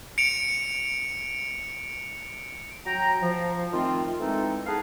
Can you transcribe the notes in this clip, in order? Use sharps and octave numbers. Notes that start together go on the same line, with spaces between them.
C#7 D7 F7
F#3 G5 A#5
F3
D#3 A3 C4 F4
E3 G#3 C4 D#4 A4
B3 D#4 G#4 B4 F5 A5